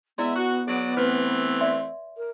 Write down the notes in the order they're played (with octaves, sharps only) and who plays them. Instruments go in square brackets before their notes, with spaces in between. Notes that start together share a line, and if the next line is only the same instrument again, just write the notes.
[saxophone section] G#3 E5 [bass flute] B3 [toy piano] E4 D5
[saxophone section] F#4
[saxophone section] F#3 D5 [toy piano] G#4
[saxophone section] E3 A3 C4 [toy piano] B4
[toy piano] D5 E5 C6
[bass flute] A#4